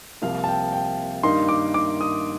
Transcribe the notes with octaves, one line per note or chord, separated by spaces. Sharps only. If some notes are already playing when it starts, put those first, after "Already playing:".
C2 C3 F3 A#3 F5
A5
G5
G5
G2 D#3 A#3 D#4 C6
D6
D6
D#6